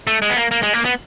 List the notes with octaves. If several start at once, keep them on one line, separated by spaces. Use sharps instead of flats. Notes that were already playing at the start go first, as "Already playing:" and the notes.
A3
G#3
B3
A#3
A#3
G#3
A#3
B3